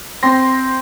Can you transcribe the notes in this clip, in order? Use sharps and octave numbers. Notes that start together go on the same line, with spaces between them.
C4 G5 C6 A#6